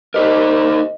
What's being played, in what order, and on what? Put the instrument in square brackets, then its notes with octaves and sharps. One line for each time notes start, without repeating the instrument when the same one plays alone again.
[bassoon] C2 [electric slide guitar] D#4 G4 A#4 [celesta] D#5